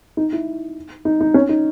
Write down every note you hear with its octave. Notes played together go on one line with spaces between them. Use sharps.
D#4
E4
D#4
D#4
C#4
D#4